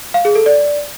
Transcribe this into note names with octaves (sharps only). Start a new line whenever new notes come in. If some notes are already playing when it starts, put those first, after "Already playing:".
F5
G#4
A4
D5